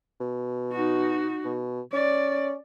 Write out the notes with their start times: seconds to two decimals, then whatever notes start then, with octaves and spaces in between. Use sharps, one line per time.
0.20 B2
0.72 D#4 F#4
1.45 B2
1.93 C#4 D5